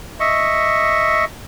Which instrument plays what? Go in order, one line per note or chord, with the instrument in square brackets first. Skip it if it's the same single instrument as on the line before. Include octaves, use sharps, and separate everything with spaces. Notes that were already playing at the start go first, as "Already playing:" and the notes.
[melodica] D#5 E5 C#6